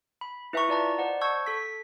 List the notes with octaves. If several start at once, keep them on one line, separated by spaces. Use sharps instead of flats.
B5
E4 B4 E5 G#5 A#5 C#6
F4 D5 A5 A#5
C5 D5 D#5 F#5
A5 C#6 E6 G6 G#6
A4 B6